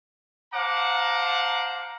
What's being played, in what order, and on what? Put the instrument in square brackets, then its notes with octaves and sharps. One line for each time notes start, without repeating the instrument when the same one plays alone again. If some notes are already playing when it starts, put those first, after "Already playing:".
[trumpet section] C5 F5 F#5 A5 A#5 D6